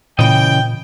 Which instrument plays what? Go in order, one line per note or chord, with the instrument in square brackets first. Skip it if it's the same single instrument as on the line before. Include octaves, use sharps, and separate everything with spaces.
[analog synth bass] A#2 [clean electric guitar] C#3 E3 D#5 [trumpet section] G5